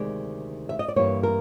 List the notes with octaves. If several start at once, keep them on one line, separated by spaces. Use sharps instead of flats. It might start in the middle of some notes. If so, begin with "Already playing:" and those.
Already playing: D2 C3 D#3 G#3 D5
E5
D#5
D5
G2 E3 G3 A#3 C#5
A#4